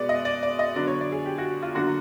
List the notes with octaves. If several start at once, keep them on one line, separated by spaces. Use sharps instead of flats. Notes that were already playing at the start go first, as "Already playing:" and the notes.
Already playing: B2 G#3 B3 D5
D#5
D5
D5
D#5
D3 F#3 B3 D4 D5
C#5
D5
G#4
G4
F#4
F4
D3 F#3 A#3 D4 F#4